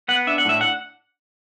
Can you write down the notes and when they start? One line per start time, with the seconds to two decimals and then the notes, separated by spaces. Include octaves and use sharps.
0.08 B3 F#5
0.27 D4 E5
0.38 F#5
0.45 A2 E5
0.61 F#5